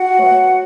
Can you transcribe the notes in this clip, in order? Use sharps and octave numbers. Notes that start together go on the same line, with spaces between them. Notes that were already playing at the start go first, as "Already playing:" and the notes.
Already playing: F#4 F#5
B2 F#3 A3